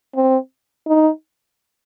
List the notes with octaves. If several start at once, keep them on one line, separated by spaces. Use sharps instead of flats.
C4
D#4